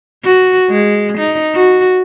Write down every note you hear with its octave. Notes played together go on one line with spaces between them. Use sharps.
F#4
G#3
D#4
F#4